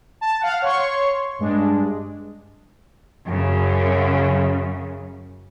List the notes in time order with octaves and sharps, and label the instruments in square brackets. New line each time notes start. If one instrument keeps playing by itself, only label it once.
[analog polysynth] A5
F5 F#5
C#5 C6 C#6
G2 G#3 D4
[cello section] F#2 C#3